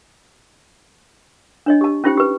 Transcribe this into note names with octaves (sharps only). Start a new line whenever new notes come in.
D4 C#5 D#5
G4 A5
C#4 D#4 F4 G4 C5 G5
G4 B4